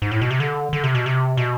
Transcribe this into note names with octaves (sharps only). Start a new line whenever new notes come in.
G#2
A2
B2
C3
D3
D3
C3
B2
C3
B2